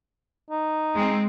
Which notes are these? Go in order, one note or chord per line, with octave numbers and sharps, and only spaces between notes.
D#4
G#3 C4